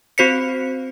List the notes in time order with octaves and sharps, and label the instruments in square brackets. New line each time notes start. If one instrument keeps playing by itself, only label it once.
[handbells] C4 F#4 C5 B6 C#7